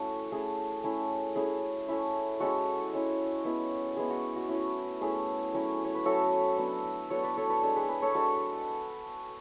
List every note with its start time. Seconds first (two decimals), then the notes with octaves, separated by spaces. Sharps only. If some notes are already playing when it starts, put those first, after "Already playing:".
Already playing: A3 C#4 E4 F#4
0.32 A3 C#4 E4 G#4
0.84 A3 C#4 E4
1.36 A3 C#4 E4 G#4
1.88 A3 C#4 E4
2.40 G#3 C#4 E4 F#4 A4
2.93 G#3 C#4 E4
3.45 G#3 B3 E4
3.97 G#3 B3 E4 G#4
4.10 F#4
4.36 F#4
4.49 A3 C#4 E4
5.01 A3 C#4 E4 G#4
5.54 F#3 C#4 E4
5.84 C#5
5.95 B4
6.06 F#3 C#4 E4 F#4 A4
6.58 F#3 B3 D4
7.10 F#3 B3 D4 A4 C#5
7.24 B4 D5
7.37 A4 C#5
7.49 B4 D5
7.63 G#3 D4 A4 C#5
7.76 G#4 B4
7.89 G#4 B4
8.02 A4 C#5
8.15 G#3 D4 F#4 A4